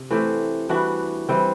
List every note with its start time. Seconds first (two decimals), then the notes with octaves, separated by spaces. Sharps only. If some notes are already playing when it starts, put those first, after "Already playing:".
Already playing: C3
0.10 E3 A3 C4 G4
0.69 E3 G3 D4 F#4
1.29 E3 G3 C4